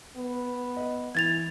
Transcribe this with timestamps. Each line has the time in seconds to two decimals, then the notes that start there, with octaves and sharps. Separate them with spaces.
0.17 B3
0.77 D#5
1.15 E3 G#6 A6 F7